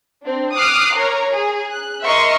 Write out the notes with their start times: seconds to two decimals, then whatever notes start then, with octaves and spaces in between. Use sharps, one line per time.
0.23 C4 D4
0.56 D6 D#6 F6 F#6 C7
0.96 A#4 C#5 A#5
1.35 G#4
1.72 F#6
2.04 A#4 D#5 E5 C6 C#6